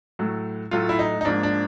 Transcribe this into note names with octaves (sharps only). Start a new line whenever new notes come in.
A2 F#3 A3
A2 F#3 A3 F4
E4
D#4
D#4
G#2 F3 A#3 D4
D4